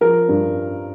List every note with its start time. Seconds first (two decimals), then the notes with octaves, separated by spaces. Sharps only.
0.01 F3 A#4
0.28 G2